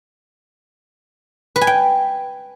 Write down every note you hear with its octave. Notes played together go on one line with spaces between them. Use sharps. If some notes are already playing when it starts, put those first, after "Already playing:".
B4
G#5
G5